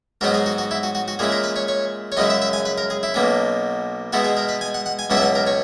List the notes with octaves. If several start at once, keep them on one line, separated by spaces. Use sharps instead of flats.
G#2 F#3 B3 D#4 A#4
G#4
F#4
F#4
E4
F#4
F#4
F#4
A#2 G#3 C#4 E4 G#4
A#4
B4
C#5
C#5
C#5
F#2 C#3 G#3 C#4 E4 D#5
E5
E5
G#5
B4
A#4
G#4
E4
B1 B2 A#3 C#4
B2 G#3 B3 E4 F#4
G#4
A#4
B4
G#5
F#5
F#5
G#5
C#2 B2 F#3 C#4 E4 F#5
E5
F#5
A#4
C#5